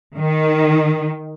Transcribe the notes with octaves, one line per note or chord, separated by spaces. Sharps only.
D#3